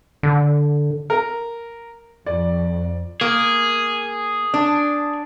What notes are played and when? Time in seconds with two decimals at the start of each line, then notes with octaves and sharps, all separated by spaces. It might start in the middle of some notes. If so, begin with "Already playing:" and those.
0.23 D3
1.10 A#4
2.26 F2 D5
3.21 A#3 G#4
4.54 D4